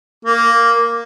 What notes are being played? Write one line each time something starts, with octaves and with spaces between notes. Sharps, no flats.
A#3